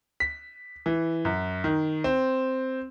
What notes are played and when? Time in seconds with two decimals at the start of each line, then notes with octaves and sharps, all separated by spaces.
0.20 B6
0.86 E3
1.25 F#2
1.64 D#3
2.04 C4